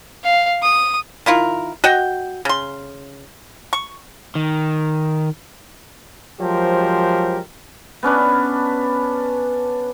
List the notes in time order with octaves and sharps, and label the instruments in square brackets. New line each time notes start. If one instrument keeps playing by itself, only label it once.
[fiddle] F5
D#6
[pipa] D#3 E4 F4 A#4
F#4 D#5 F#5 G5
C#3 C6
C#6
[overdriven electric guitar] D#3
[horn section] F3 F#3 G#3 G4 A#4 C5
[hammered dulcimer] B3 C#4 D4 B4